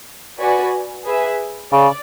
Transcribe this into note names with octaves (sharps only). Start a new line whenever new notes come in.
F#4 B4 D5 G#5
G#4 B4 E5
C#3 D5